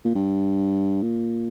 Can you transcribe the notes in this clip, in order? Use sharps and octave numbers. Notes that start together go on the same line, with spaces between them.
A#2
G2
A#2